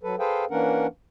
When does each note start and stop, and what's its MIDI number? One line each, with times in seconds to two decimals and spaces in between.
0.03 0.16 54
0.03 0.16 69
0.03 0.16 71
0.19 0.45 68
0.19 0.45 69
0.19 0.45 71
0.19 0.45 72
0.19 0.45 77
0.19 0.45 79
0.51 0.87 52
0.51 0.87 58
0.51 0.87 61
0.51 0.87 62
0.51 0.87 70
0.51 0.87 78